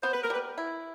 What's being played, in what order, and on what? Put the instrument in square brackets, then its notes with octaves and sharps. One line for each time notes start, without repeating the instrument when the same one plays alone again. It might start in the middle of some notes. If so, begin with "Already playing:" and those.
[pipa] B3 [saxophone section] C5
[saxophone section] B4
A#4
[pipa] G3 [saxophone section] B4
[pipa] E4